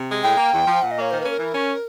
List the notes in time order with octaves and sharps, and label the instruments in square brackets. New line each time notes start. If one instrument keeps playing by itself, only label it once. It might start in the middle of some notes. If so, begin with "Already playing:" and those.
Already playing: [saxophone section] C3
G#3
[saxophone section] A2 [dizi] G5
[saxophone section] A#3
E2
F3
[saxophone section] A#2 [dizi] F#5
[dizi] D#5
[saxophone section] A#3 [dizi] C#5
[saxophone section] D#3 [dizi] C5
[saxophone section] C#4 [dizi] B4
[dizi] A#4
[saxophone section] E3
C#4